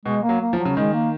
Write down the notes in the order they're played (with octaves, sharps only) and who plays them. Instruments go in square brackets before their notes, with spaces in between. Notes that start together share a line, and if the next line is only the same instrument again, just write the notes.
[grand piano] B2 [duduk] G#3
[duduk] A#3
[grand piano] F#3
[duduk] A#3
[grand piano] F3
[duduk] F#3
[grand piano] C#3
[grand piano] D#3 [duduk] G#3
[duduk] A#3